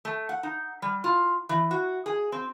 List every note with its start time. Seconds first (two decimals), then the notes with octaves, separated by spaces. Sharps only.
0.05 A3
0.29 F#5
0.43 D#4
0.82 G3
1.04 F4
1.49 E3
1.71 F#4
2.06 G#4
2.32 C4